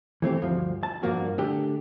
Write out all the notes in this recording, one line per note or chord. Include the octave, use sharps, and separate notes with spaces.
E3 A3 C4 G4
D2 G2 F3
A5
G2 A#2 F3 A#3 F#4
D3 A3 G4